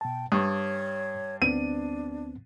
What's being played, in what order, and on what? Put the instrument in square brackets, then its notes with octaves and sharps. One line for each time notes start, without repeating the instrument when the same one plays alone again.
[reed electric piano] B2 A5 [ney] G5
[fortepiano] G2 [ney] C#5 [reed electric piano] C#6 D#6
[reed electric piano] D2 B3 C4 [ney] D4 [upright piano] D#7